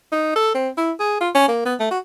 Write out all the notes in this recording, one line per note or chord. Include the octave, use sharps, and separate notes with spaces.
D#4
A4
C4
E4
G#4
F4
C#4
A#3
B3
A3
F#4